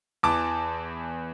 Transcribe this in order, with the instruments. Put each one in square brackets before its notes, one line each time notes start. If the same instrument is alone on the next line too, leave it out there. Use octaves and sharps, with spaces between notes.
[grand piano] E2 E3 A5 D6